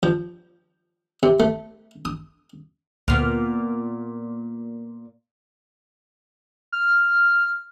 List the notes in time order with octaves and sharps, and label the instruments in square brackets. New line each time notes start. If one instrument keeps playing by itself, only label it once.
[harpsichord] F3
C3
A3
D#6
[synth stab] D2 F6 [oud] A#2 B3
[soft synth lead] F6